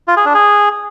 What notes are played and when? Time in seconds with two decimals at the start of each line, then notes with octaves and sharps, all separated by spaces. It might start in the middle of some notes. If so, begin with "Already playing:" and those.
0.08 F4
0.17 G#4
0.25 D4
0.34 G#4